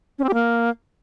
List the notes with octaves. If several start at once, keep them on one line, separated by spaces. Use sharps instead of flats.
C#4
C4
G4
A#3